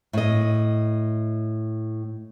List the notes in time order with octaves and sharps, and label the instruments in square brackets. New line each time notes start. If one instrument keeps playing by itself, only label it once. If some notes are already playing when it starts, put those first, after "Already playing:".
[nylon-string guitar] A2 D#5